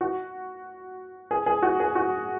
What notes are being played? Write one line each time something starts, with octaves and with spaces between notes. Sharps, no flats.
F#4
G#4
G#4
F#4
G#4
F#4